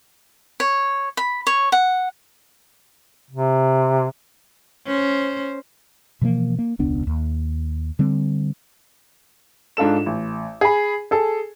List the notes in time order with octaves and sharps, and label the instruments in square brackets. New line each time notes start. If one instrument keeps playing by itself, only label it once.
[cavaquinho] C#5
B5
C#5
F#5
[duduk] C3
[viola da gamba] C#4 C5
[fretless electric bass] B2 E3 F3 A#3
A#3
E1 C#2 B3 D4
D#2
D3 G3 C4
[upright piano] G#2 D4 F4 A4 E7
A1
G#4 B5
G#4 A4